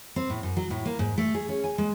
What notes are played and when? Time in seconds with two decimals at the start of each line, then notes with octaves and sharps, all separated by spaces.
0.16 C4
0.30 A2
0.43 F#2
0.57 F#3
0.70 A2
0.85 A#3
0.99 G#2
1.18 A3
1.34 G#4
1.49 C#4
1.64 G#5
1.78 G#3